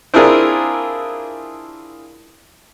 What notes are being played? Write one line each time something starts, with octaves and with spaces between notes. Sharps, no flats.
C4 D4 E4 F4 G#4 A#4